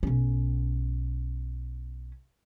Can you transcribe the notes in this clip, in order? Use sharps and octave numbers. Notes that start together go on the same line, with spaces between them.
B1 C#4